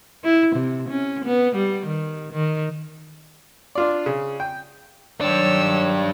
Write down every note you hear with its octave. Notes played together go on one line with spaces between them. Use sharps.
E4
C3
C#4
B3
G3
D#3
D#3
D4 F4 D5
C#3
G5
D#3 F#3 G3 D4 C#5 E6